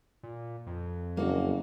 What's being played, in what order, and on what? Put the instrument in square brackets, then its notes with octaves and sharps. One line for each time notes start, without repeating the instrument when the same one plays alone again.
[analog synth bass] A#2
F2
[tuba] F#1 [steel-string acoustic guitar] A#3 F#4